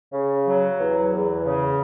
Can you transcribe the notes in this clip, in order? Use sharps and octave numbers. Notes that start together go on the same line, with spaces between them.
C#3
F#3
E2
E2
C#3